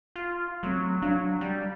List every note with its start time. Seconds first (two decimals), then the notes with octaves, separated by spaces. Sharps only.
0.16 F4
0.63 F#3 A3 C4
1.02 F#3 D4 F5
1.41 G3